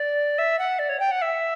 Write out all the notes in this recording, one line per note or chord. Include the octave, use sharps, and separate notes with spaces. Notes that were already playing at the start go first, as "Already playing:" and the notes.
Already playing: D5
E5
F#5
D5
C#5
G5
F#5
E5